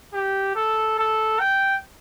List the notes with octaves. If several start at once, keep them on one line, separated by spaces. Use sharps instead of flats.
G4
A4
A4
G5